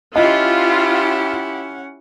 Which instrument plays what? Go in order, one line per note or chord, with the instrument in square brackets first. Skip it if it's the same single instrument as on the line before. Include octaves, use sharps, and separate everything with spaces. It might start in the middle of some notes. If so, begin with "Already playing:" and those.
[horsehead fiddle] C#4 F#5 [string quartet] E4 G4 [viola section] F4 [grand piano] D#5